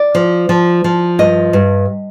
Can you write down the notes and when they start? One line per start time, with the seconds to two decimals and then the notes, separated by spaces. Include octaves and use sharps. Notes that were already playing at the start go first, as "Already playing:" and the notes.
Already playing: D5
0.15 F3
0.49 F3
0.84 F3
1.19 G2 D#5
1.53 G2